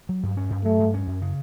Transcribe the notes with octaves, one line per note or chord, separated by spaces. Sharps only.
F#3
G2
C#4
G2
F#3 A3
G2
C#4
F#2
C#3